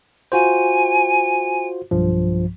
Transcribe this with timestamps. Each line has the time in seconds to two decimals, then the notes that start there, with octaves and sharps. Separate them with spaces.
0.32 F4 F#4 C5 G#5
1.91 B1 G2 F3